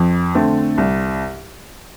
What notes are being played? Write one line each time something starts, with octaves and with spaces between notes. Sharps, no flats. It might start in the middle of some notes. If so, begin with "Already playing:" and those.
Already playing: F2
D3 A3 C4
C2